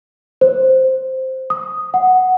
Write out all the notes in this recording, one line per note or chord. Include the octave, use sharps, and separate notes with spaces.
C5
D#6
F#5